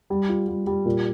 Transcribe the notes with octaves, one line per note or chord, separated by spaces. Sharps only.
G3
F4
G3
G3
A#2